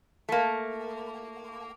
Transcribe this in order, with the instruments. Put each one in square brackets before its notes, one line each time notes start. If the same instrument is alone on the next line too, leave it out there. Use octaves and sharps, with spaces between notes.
[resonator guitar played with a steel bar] A3 A#3